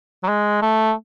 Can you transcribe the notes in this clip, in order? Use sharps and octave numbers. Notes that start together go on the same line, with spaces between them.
F#3
G#3
A3